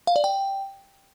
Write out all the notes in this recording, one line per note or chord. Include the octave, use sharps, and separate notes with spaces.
F5
D5
G5